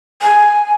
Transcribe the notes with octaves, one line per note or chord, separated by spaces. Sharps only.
G#5